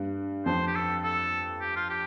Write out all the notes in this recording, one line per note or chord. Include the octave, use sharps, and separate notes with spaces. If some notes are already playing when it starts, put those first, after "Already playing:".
Already playing: G2
F2 C5
G4
A4
A4
G4
F4
G4